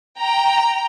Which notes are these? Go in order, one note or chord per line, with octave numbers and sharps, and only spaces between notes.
G5 A#5